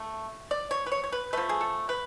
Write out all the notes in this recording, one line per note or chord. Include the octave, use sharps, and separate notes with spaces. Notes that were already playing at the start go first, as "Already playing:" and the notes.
Already playing: A3
D5
C#5
B4
C#5
C#5
B4
F3 A3 B4
G#4
A4
B4